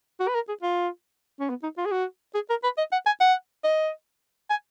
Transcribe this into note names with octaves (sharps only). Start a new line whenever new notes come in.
F#4
B4
A#4
G#4
F4
C#4
B3
D#4
F4
G#4
F#4
G#4
A#4
B4
D#5
F#5
G#5
F#5
D#5
G#5